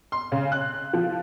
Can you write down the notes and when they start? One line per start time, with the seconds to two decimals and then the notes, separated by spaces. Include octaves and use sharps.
0.12 C6
0.32 C#3
0.52 F#6
0.93 F3